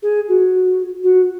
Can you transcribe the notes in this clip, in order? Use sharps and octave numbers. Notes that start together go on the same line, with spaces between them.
G#4
F#4
F#4